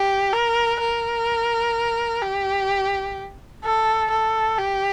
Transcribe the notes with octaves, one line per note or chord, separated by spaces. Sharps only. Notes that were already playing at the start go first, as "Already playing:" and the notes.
Already playing: G4
A#4
A#4
G4
A4
A4
G4